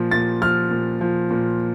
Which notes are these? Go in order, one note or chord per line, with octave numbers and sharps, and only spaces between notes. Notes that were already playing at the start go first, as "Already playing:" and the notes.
Already playing: A#2 F3
A#2 A6
F3 F6
A#2
F3
A#2